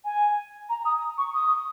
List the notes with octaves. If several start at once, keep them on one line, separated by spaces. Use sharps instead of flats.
G#5
A#5
D#6
C#6
D#6